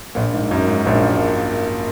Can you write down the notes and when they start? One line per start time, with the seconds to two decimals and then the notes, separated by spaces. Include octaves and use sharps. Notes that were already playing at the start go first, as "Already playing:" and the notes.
0.15 A#1 A#2
0.33 G#2
0.51 F#2
0.68 G#2
0.85 A#1 A#2